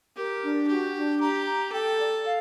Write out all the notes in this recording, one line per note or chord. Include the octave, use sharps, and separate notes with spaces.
G4 A#4
D4
F#4 G4
D4
G4 A#5
A#5
A4 G5
D5
F5